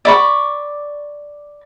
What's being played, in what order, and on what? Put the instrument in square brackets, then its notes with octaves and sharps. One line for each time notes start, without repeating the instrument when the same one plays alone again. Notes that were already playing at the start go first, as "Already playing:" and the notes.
[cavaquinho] D5 B5 C#6